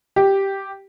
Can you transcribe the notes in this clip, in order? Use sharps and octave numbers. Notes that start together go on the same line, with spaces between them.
G4